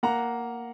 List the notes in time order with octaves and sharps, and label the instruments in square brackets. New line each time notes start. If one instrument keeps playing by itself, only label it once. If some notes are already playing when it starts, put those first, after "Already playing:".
[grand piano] A#3 F#5 A#5